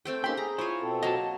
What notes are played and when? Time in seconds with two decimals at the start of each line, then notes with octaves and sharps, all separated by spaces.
0.05 A3 C4 G5
0.24 A#3 C#4 D#4 G4 G5 B5 C6
0.37 G#4 A#5
0.58 E4 F4 C5 C#5
0.81 B2 C4 A4
1.03 F#3 A#3 D#5 A5